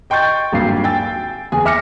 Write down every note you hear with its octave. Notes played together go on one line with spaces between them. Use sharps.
D#5 G5 C6 C#6 G6 A6
D#1 G#1 G2 F#3 A#3 C7
G5 G#5 E6 A6
F#1 E2 G#4 G#5
E5 D6 F6 A#6 C#7